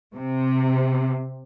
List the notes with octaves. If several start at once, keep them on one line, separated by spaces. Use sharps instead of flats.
C3